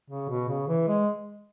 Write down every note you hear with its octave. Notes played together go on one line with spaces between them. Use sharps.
C#3
B2
C#3
E3
G#3